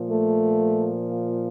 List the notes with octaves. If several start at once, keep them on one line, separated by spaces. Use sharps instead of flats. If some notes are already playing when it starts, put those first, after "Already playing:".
Already playing: A#2 F3
A3